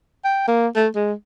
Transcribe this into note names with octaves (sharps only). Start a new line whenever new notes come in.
G5
A#3
A3
G#3